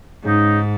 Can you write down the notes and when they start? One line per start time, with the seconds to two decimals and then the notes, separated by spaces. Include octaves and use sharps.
0.23 G#2 C#3 G#3 D#4